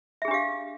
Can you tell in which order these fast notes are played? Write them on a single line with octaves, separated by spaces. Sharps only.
E5 G#4 D4 G4 F5